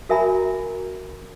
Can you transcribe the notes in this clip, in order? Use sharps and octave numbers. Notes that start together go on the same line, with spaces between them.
F#4 A#4 E5 G#5 A#5 B5